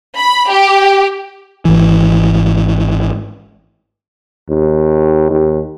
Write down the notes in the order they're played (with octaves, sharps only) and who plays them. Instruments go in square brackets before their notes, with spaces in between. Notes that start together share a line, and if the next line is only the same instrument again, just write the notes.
[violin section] B5
G4
[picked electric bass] G#1 E3
[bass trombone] D#2
D#2